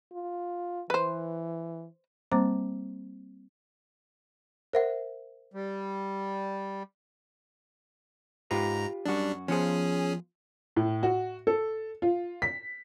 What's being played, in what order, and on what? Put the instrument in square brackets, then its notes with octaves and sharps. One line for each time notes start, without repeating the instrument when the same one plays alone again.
[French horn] F4
[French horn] E3 [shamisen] B4 C5
[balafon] G3 A#3 C4 C5 A#5 D6
[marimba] A#4 [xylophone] C5 E5 F#5
[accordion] G3
[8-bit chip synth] G#2 A#5 [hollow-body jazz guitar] F4 G4 B4
[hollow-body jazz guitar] F#2 F#4 [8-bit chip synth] G3 D4
[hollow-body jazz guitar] F3 B3 C5 [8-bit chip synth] C#4 G#4
[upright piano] A2
F#4
A4
F4
B6